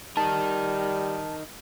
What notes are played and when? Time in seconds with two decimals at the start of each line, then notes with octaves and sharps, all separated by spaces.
0.17 G3 D#4 A#4 A5